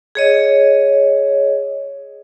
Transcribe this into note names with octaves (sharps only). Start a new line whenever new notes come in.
G#4 C#5 D#5